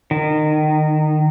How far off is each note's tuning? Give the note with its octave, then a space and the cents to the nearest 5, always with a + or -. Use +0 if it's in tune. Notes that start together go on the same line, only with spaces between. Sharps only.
D#3 -25